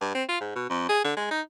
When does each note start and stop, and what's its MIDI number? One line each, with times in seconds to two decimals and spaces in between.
0.01 0.12 43
0.14 0.23 60
0.28 0.37 65
0.40 0.51 44
0.56 0.67 47
0.69 0.86 41
0.89 1.04 68
1.04 1.15 50
1.17 1.29 56
1.31 1.41 63